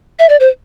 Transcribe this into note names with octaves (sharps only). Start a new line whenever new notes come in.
E5
D5
C5